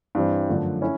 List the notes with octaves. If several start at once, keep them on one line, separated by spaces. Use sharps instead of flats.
G2 E3 G3 C4
F#2 D3 F3 A3
C#4 E4